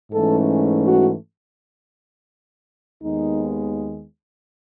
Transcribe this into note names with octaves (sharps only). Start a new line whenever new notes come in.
G#2 E3 A3 C#4 A4
F#4
D#2 D#3 G#3 B3 D#4